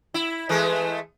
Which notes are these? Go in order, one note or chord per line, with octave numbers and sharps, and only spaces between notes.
E4
E3 G#3 A3